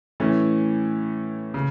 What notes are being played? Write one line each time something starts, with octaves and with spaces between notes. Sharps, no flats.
A2 E3 A3 C#4
C#3